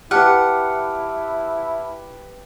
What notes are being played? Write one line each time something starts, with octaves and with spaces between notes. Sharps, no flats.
E4 G4 B4 F#5 A5 D6 F6